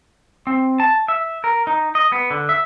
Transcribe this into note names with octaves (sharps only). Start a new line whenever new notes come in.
C4
A5
E5
A#4
D#4
D#5
B3
D3
E5